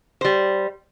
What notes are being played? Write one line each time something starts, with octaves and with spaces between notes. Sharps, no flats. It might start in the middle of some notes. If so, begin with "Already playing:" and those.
G3 C5